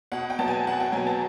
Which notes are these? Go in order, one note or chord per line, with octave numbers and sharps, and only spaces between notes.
B2 F#5
G5
F#3 B3 A5
G#5
B2 F#5
G5
F#3 B3 G#5
A5